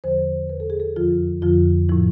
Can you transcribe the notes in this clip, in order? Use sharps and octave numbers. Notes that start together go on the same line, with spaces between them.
E2 D3 F3 C5
E2 D3 F3 B4
A4
G#4
A4
F2 D3 F3 F4
F2 D3 F3 F4
A2 F3 E4